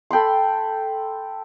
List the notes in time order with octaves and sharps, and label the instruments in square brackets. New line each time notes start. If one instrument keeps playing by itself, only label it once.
[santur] A4 G5 B5 C6